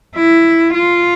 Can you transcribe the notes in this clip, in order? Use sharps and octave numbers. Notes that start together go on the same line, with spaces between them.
E4
F4